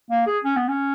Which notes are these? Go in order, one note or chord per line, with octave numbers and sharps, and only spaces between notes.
A#3
G#4
C#4
B3
C#4